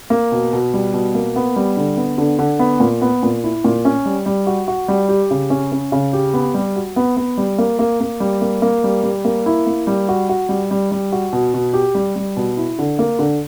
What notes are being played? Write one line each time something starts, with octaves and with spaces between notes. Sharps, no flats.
A#3
B2
B2
G3
B2
A#3
B3
G3
D3
B3
D3
D3
B3
A#2
B3
A#2
E4
A#2
C#4
G3
G3
F#4
F#4
G3
G4
C#3
C#4
C#4
C#3
G4
B3
G3
F#4
B3
B3
G3
A#3
A#3
A#3
G3
A#3
A#3
G3
G3
A#3
E4
A#3
G3
F#4
F#4
G3
G3
G3
F#4
B2
B2
G4
G3
G3
B2
E4
D3
A#3
D3